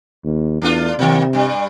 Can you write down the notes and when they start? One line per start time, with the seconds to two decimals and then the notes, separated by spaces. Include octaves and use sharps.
0.24 D#2
0.62 E2 A3 D4 F4
0.99 C3 D#3 A#3
1.33 G2 G3